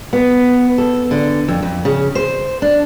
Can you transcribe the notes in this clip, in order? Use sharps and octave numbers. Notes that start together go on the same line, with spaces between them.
B3
A4
D3
F2
F2
C#3
C5
D4